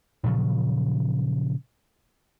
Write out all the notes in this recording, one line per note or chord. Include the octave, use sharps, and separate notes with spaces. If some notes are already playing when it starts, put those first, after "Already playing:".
A#2 C#3 F3 F#3